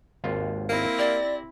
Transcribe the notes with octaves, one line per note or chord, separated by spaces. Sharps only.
G#1 D#2 F4
A#3 C4 E4 A#6
G4 D5